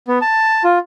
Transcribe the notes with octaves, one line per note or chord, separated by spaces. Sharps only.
B3
A5
F4